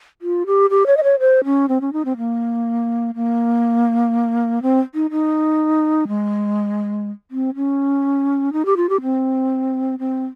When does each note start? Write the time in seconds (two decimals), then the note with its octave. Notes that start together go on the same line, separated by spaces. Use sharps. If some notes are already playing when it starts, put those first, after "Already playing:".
0.22 F4
0.46 G4
0.70 G4
0.87 C#5
0.97 D#5
1.03 C#5
1.19 C5
1.44 C#4
1.69 C4
1.81 C#4
1.93 D#4
2.05 C4
2.17 A#3
3.15 A#3
4.62 C4
4.94 D#4
5.11 D#4
6.08 G#3
7.31 C4
7.55 C#4
8.53 D#4
8.66 G4
8.77 F4
8.89 G4
9.02 C4
9.99 C4